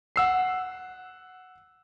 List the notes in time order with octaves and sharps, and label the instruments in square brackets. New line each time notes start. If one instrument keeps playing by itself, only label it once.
[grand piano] F#5 E6 C7